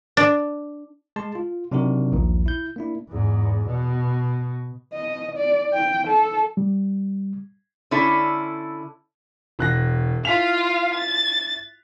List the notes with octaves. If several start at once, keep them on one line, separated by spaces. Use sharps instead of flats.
D4
G#3 A5 C6
F4
C3 F#3 D4 D#4 F#4 A#4
A#1 D#2 A#2
E4 G6
A#3 D4 E4
E2 G#2
B2
D#5
D5
G5
A4
G3
D3 C#4 E4 A4
E1 F#6 A#6
E4 F4 F5 B6 F7
A6